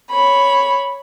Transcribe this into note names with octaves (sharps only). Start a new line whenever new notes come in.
C#5 B5